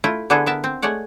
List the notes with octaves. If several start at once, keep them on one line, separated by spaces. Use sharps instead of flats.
A3 E4 F4
D3 B3 D4 E4 G#4 A4
B3 A#4 E5 A5
C4
G#3 A3 C#5 D5 F#5